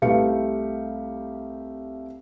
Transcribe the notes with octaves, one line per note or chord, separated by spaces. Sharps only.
C2 A3 G4 B4 F5 C#7